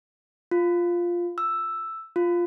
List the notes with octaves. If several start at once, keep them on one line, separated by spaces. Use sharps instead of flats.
F4
E6
F4